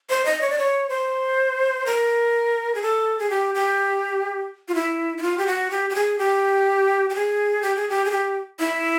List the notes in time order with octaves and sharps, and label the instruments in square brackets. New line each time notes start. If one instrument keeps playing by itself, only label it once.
[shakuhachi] C5
D#5
C#5
D5
C#5
C5
A#4
G#4
A4
G#4
G4
G4
F4
E4
E4
F4
G4
F#4
G4
G4
G#4
G4
G4
G#4
G4
G#4
G4
G#4
G4
E4